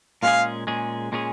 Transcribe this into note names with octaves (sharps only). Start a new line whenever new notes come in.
A#2 G#3 C#4 G#4 F5
A#2 G#3 C#4 G#4
A#2 G#3 C#4 G#4